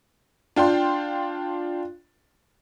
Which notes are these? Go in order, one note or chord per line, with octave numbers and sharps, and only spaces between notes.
D4 F4 G5 C6